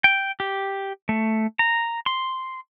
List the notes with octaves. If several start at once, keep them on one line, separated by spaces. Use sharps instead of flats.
G5
G4
A3
A#5
C6